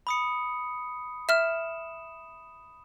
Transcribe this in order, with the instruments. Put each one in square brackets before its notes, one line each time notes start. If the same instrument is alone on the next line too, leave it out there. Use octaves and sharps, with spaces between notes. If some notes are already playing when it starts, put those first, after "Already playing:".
[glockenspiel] B5 D#6 C#7
[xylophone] E5 F6 [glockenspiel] E7